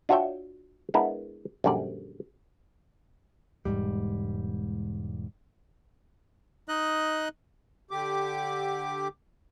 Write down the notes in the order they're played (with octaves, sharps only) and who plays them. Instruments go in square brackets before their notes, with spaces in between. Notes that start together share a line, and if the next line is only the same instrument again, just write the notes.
[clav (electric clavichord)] D4 F4 F#4 C#5 E5 G5
G#3 B3 D4 E4 A#4
A#1 F#2 D3 G3 D5
[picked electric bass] E1 D#2 G#2 G3
[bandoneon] D#4 D#5 F#6
[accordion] D3 G4 D6